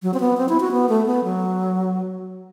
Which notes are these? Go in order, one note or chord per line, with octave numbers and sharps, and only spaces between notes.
F#3
C4
B3
C4
E4
F#4
B3
A3
B3
F#3